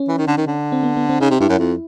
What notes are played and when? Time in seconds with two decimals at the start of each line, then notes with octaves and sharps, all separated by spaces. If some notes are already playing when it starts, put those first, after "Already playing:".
Already playing: C#4
0.08 E3
0.18 D#3
0.27 D3
0.37 D#3
0.47 D3
0.72 C4
0.83 B3
0.97 B3
1.09 C4
1.21 C#3 D#4
1.30 C3
1.40 G2 E4
1.49 F#2
1.59 F2